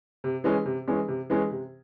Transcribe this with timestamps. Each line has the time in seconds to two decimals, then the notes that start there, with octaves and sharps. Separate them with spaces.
0.24 C3
0.44 E3 G#3 C#4
0.66 C3
0.87 E3 G#3 C#4
1.08 C3
1.30 E3 G#3 C#4
1.51 C3